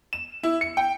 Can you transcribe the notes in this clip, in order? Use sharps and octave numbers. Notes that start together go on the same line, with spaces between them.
E7
E4
C#7
G5